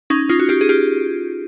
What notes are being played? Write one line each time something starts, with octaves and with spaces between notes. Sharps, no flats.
C#4 D#4
D#4 F4
F#4
F4 G4
G#4
F4 G4